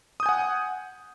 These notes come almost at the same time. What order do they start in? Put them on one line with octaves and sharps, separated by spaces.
D#6 G6 G#5 F#5